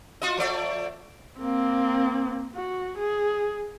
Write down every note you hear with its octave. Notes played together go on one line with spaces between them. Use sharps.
F4 F#4 D#5
F3 A3 D5
A#3 C4
F#4
G#4